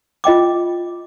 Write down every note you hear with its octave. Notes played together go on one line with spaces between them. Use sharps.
F4 D#5 G5 D6